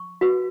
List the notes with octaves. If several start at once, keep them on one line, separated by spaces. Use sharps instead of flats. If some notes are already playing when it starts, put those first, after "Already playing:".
Already playing: C#6
F#4 B4